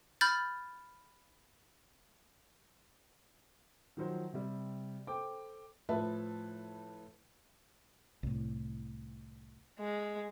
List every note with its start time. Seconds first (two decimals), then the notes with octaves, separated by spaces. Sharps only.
0.21 B5 F6 G6 A6
3.97 D#3 F3 F#3 C5
4.33 C3 G3
5.07 A4 C5 G5 D6
5.89 A2 F3 B4 E5 A5
8.23 C2 A2
9.80 G#3